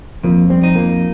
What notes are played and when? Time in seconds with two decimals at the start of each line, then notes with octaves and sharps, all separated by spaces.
0.24 F2 F3 A#3
0.50 G3 C4
0.64 D#4
0.75 F3 A#3